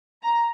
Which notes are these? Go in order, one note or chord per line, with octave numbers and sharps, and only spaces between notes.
A#5